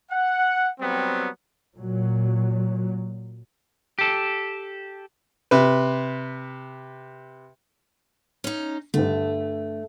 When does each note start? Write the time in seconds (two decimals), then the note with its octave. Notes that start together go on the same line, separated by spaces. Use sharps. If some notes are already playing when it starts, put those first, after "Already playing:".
0.11 F#5
0.80 F#3 G3 B3 C4
1.76 A#2 F#3
3.99 G4 A4
5.51 C3 B4
8.44 C#4 D#4
8.94 G2 D3 A3